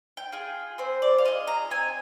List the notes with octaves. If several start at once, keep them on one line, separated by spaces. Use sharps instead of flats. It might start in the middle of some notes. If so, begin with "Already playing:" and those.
G5
F4 G#4
C4 C5
D5
F5
F4 G#4 D#5
A#5
C4 G#5